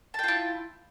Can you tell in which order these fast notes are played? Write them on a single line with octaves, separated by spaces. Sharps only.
A5 G5 F4 E4